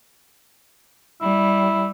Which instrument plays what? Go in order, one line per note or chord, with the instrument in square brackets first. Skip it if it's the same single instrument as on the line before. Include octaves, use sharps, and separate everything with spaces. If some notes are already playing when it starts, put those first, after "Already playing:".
[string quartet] G3 [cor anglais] E4